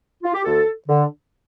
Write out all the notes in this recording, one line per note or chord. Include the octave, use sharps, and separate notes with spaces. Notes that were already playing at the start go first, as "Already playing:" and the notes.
F4
G4
D2 A4
D3